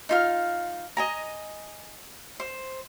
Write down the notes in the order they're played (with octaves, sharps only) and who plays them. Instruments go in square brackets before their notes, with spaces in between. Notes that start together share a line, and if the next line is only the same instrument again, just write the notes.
[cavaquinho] D#4 F4 F5
D#5 G#5 A#5
C5